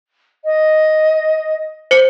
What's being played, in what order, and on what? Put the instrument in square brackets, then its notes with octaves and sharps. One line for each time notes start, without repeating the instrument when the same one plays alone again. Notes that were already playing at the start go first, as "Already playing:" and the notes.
[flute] D#5
[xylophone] C5 C#7